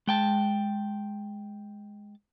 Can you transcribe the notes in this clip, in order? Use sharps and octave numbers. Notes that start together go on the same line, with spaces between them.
G#3 G5 A5